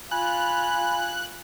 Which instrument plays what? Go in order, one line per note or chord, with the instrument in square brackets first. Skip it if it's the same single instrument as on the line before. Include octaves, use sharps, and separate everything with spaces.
[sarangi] F4 [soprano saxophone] G#5 [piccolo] B5 [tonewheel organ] F#6